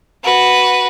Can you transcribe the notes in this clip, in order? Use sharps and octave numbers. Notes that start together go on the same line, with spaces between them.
F#4 B4